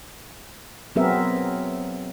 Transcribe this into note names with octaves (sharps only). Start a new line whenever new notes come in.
F#3 B3 C4 G#4 A#4 E5